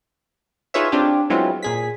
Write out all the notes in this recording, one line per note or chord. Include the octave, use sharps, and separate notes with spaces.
D#4 F4 G#4 B4 C#5 E5
C4 D4 F4 G4
F#3 G#3 B3 C4 E4 F4
A#2 G#4 B6